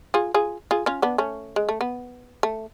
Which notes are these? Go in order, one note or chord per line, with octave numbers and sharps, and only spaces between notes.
F4 G#4
F4 G#4
F4 G#4
C#4 F4
B3 D4
A3 C#4
G#3
A3
B3
A3